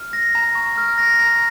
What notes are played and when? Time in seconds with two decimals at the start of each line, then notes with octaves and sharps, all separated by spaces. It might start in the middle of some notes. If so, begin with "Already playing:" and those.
Already playing: F6
0.13 A#6
0.35 A#5
0.55 C#6
0.78 F6
0.98 A#6
1.19 A#5